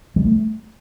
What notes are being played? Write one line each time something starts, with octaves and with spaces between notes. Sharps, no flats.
G3
A3